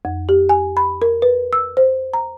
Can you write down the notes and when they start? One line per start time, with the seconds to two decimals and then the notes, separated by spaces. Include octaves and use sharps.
0.05 F2
0.29 G4
0.49 G#5
0.77 B5
1.02 A#4
1.22 B4
1.53 E6
1.77 C5
2.13 A#5